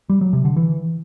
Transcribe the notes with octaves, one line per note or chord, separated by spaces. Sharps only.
G3
F#3
C3
D3
E3